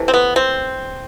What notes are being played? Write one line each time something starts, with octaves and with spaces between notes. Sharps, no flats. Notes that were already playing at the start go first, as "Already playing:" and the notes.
Already playing: C3 E3 A3
C4
B3
C4